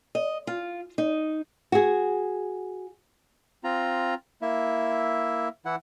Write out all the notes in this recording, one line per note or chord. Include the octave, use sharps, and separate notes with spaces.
D#5
F4
D#4
F#4 G#4
C4 F4 A#5
A#3 E4 E5
E3 E4 F#5